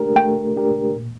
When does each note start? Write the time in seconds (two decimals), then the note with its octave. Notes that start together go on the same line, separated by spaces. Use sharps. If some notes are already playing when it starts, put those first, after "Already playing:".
Already playing: A3 D4 G4 A#4
0.16 A3 G5
0.56 D4 G4 A#4
0.96 A#2